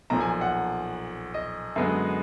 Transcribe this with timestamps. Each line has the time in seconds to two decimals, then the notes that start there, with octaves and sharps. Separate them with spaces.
0.10 B1 A#2 F3 A#5
0.20 G#5
0.41 F#5
1.34 D#5
1.76 F#2 D3 G#3 B3